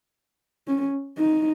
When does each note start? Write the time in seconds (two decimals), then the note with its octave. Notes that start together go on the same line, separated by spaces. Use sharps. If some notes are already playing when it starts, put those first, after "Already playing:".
0.68 C#4
1.18 D#4